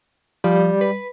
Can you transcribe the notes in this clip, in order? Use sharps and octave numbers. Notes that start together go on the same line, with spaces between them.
F3 G3
B4